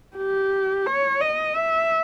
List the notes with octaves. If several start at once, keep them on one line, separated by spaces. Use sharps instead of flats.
G4
C#5
D#5
E5